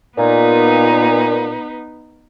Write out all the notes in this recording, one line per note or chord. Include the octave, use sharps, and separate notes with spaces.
A#2 B3 D#4 B4